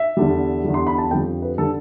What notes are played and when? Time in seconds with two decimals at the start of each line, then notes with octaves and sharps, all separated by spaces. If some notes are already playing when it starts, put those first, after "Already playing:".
Already playing: E5
0.17 E2 D3 G3
0.64 E2 D3 G3
0.74 C6
0.87 B5
0.98 A5
1.11 F2 D3 G3 G5
1.42 B4
1.58 D3 G3 A4